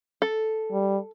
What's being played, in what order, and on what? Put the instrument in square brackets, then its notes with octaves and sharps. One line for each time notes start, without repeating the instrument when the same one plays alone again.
[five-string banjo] A4
[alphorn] G3